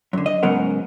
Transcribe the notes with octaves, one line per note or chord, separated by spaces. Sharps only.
F#2 D3
D#5
G#2 C#3 F#3 B3 A#4 F#5